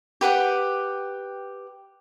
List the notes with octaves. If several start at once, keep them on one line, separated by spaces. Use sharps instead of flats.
G4 B4 F#5 G5